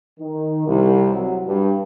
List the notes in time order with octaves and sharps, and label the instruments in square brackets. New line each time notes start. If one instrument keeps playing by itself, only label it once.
[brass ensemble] D#3
C2
F#3
G2